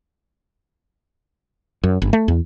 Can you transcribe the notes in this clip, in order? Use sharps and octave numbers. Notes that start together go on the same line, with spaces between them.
F#2
G1
A3
E2